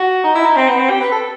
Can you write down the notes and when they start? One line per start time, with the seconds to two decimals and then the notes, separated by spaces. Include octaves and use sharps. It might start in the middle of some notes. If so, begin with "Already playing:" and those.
Already playing: F#4
0.24 D#4
0.35 E4
0.46 D#4
0.56 C4
0.68 B3
0.79 C4
0.90 G4
1.01 B4
1.11 A4